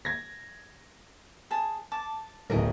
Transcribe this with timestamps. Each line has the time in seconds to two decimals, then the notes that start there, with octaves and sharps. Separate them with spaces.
0.05 G#6 A#6
1.51 G#4 A5
1.92 A5 D6
2.50 D1 B1 E3 A#4 D#5